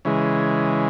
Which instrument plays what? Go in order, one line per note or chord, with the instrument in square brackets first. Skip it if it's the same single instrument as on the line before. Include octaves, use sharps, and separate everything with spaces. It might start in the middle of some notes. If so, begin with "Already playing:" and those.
[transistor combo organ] C#3 E3 G#3